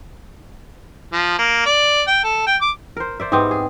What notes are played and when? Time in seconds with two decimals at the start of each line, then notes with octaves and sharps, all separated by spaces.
1.13 F3
1.38 A#3
1.65 D5
2.07 G5
2.24 A4
2.47 G5
2.61 D6
2.97 A#4 C5
3.20 C5 D5 E5
3.32 G#2 G3 B3 C4
3.51 G#4